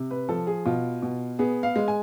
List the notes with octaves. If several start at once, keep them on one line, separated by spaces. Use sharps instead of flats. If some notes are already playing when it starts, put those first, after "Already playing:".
Already playing: C3
B4
F3 A4
G#4
B2 F4
B2
B3 G#4
F5
G#3
G#5